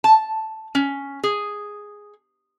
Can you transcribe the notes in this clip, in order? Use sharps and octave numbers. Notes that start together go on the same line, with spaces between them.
A5
C#4
G#4